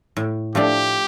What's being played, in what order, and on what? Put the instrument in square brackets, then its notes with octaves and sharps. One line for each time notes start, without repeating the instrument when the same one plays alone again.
[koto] A2
[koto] F3 A3 D4 [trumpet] G4